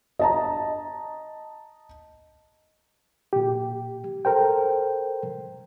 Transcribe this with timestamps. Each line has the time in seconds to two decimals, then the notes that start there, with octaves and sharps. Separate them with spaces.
0.19 D#5 A5 A#5
3.33 A#2 G4
4.25 A4 A#4 C5 G5